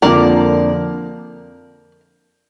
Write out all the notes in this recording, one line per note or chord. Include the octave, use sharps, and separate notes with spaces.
F2 D3 F3 A#3 A#4 D5